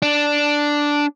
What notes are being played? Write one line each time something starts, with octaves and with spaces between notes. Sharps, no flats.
D4